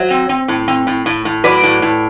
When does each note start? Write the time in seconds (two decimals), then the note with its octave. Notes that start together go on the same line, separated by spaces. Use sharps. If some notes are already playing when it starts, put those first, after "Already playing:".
Already playing: F#3 C5 E5
0.10 C4
0.29 C4
0.48 A2
0.68 C4
0.87 A2
1.06 A2
1.25 A2
1.44 F#3 B4 D5
1.63 A2
1.82 A2